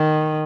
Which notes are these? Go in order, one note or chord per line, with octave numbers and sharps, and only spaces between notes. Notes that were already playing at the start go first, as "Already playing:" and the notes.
Already playing: D#3